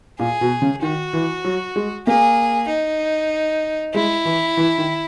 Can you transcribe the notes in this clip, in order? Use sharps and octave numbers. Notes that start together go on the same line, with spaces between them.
A#2 G#4
B2
C#3
D#3 F#4
E3
F#3
G#3
A#3 G#4
D#4
G#3 E4
E3
E3
D#3